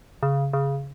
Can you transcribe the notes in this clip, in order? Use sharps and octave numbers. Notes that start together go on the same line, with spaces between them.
C#3
C#3